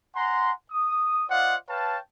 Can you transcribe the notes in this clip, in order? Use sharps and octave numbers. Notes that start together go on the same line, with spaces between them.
F#5 G#5 A#5 C6
D#6
F4 C5 D5 D#5 F5 F#5
B4 C#5 F5 G5 A5